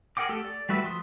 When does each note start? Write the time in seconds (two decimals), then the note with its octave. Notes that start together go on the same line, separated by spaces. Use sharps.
0.17 G#4 A#4 F#5 G5 D6
0.29 A3 G4 A4
0.44 D5
0.69 G3 A3 F#4 B4 E5
0.84 F3 C6 D#6